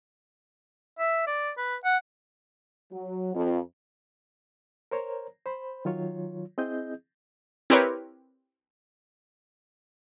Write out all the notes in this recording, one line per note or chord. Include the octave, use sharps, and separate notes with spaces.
E5
D5
B4
F#5
F#3
F2
A#4 C5 C#5 A#5
C5 B5
D#3 F#3 F4 C#5
C4 E4 G#4 D#5 G6
C4 E4 G4 A#4 B4 C#5